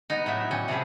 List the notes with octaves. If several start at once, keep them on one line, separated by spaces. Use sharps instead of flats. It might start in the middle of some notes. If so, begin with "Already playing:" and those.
B3 D#4
A2 F#3 E5
G3 C#4
C3 F3 F#3 G#4 B4